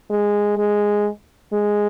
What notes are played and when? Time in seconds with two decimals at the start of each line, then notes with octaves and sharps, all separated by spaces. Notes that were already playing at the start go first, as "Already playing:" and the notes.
0.10 G#3
0.57 G#3
1.53 G#3